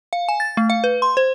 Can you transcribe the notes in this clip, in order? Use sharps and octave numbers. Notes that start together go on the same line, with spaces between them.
F5
G#5
A6
A3
F5
B4
C6
C5